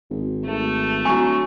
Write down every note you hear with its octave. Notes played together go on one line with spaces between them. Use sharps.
G#1
G#1 A3
D1 F#3 G#5 C#6